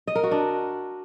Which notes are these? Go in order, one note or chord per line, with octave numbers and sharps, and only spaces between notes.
D#5
A#4
F#4
D4